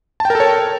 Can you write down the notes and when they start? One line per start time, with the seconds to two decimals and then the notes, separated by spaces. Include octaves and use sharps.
0.20 A5
0.25 G5
0.30 A#4
0.35 A4
0.40 C#5